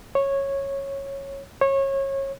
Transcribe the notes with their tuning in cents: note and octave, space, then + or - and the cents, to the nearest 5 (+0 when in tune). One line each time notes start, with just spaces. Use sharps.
C#5 -10
C#5 -25